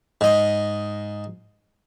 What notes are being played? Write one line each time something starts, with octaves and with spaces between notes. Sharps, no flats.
G#2 D#5